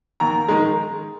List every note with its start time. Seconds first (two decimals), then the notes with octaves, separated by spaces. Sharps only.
0.20 D#2 A#5
0.49 D#3 G#3